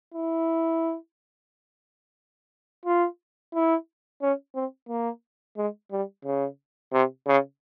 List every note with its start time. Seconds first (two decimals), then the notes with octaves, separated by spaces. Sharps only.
0.14 E4
2.86 F4
3.54 E4
4.22 C#4
4.55 C4
4.89 A#3
5.57 G#3
5.92 G3
6.25 C#3
6.93 C3
7.27 C#3